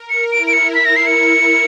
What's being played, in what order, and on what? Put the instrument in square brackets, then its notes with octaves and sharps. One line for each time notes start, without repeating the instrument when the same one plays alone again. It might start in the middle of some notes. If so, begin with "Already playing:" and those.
Already playing: [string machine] A#4
[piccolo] C#7
[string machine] E4 [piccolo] D7
[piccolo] D7
C#7
B6
A#6
C7
C#7